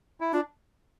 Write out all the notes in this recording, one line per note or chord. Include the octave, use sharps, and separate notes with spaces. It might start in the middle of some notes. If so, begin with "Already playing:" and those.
E4
D4 F4